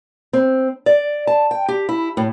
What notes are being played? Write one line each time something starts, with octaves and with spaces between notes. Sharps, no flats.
C4
D5
A5
G5
G4
E4
A2